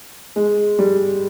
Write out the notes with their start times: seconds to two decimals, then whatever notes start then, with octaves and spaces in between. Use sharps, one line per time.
0.36 G#3
0.79 G3